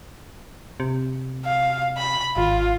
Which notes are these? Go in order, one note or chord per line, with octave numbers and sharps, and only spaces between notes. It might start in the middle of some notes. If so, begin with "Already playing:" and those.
C3
F5
B5
G#1 F4